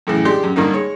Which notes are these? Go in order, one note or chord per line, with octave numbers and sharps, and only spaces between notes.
F#2 A2 C#3 E3
G#3 D4 G4 G5 C6
F#2
G2 D3 A#3 D#4
G#3 C#5